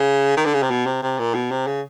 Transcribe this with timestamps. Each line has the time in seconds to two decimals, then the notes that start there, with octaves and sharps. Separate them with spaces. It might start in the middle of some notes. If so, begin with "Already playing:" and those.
Already playing: C#3
0.37 D#3
0.45 D3
0.54 C#3
0.63 C3
0.71 B2
0.86 C3
1.03 C3
1.19 A#2
1.35 B2
1.52 C3
1.67 C#3